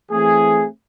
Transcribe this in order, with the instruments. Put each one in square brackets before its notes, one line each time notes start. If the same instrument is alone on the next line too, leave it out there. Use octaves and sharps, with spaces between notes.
[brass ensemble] E3 A3 C4 G#4